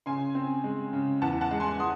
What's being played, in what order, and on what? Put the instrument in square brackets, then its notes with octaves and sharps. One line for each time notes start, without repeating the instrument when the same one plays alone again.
[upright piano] C#3 G#5 C6
C4
G#3
C#3
E2 F#5 A5
F#5 A5
G#3
G#5 C6
G#3 C6 D#6